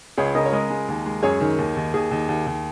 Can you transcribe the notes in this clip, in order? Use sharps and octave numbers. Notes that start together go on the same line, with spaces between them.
C#2 G#4 C#5
C#3 A#4 D#5
C#5
G#3 A#4 D#5
G#3
D#2
G#3
F#2 G#4 C#5
D#3
D#2
D#2
D#2 G#4
D#2
D#2
D#2